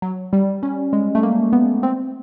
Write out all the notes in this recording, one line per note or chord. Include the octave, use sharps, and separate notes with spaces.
F#3
G3
C#4
G#3
A3
A#3
B3
C4